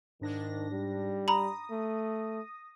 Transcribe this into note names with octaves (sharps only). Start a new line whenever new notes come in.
G#2 D#3 D4 A#6
G3
A#5 B5 D#6 A#6
A3